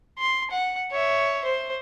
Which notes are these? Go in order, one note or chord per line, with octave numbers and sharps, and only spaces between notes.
C6
F#5
C#5 E5
C5